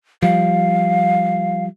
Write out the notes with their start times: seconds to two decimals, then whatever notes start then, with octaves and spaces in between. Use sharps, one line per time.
0.22 F3 G3 F5